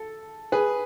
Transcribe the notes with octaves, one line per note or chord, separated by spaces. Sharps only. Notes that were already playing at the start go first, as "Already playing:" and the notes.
Already playing: A4
G#4 B4